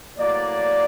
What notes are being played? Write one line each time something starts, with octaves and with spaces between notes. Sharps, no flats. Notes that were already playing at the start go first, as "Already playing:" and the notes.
A2 F#3 A#3 D5